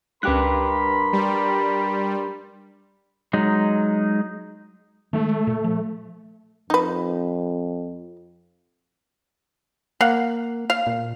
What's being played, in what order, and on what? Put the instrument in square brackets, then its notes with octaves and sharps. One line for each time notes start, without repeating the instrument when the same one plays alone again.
[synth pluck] C#2 F#6 [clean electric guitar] G2 G4 B4 [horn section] A#4 B5 C6
[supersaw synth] G3
[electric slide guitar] F#3 G#3 D#4
[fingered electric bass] D#3 E3 G#3 [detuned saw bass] A3
[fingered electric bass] A#2
F3
[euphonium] F2 [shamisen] D#4 B4
[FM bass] A#3 [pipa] F5 F#5
[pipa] F5
[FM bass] A#2